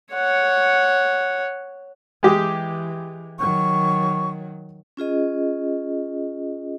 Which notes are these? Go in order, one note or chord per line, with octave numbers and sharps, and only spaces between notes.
C#5 F#5
E3 G#3 G4
D#3 F#3 C#6
C#4 F4 G#4 D#5